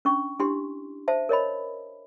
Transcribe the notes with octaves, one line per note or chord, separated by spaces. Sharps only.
C#4 D4 C#6
D4 E4 G4 C6
C5 E5 A5
A#4 C#5 D#5 B5